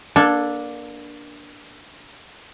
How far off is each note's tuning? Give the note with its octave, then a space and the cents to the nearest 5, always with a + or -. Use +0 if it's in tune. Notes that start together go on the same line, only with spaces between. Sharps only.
A#3 +30 D4 +0 A4 +0